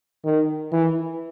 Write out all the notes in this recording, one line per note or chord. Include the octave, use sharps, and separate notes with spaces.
D#3
E3